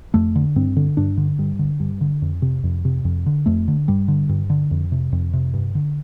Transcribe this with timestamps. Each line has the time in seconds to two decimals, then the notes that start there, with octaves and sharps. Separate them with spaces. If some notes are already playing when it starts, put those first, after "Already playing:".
0.14 F2 A3
0.35 D3
0.56 G2 C4
0.76 D3
0.97 G2 D4
1.17 D3
1.39 G2
1.59 D3
1.80 G2
2.01 D3
2.22 F2
2.42 C3
2.63 F2
2.85 C3
3.05 F2
3.26 D3
3.46 F2 A3
3.68 D3
3.88 G2 G3
4.08 D3
4.29 G2
4.50 D3
4.71 F2
4.92 C3
5.12 F2
5.33 C3
5.53 G2
5.75 D3